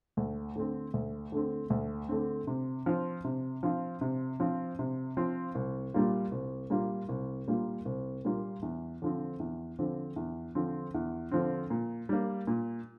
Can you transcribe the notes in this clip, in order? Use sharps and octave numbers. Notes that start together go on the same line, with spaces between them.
D2
D3 A3 C4
D2
D3 A3 C4
D2
D3 A3 C4
C3
F3 C4 F4
C3
F3 C4 F4
C3
F3 C4 F4
C3
F3 C4 F4
C2
A#2 G3 A#3 F4
C2
A#2 G3 A#3 F4
C2
A#2 G3 A#3 F4
C2
A#2 G3 A#3 F4
E2
D3 F3 C4
E2
D3 F3 C4
E2
D3 F3 C4
E2
D3 F3 C4
A#2
G3 A#3
A#2